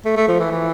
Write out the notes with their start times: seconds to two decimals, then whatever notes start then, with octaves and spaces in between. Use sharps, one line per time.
0.05 A3
0.16 A3
0.28 F3
0.40 E3
0.51 E3